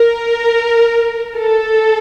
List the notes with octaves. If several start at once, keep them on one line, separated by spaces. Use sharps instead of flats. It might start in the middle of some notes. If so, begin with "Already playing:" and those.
Already playing: A#4
A4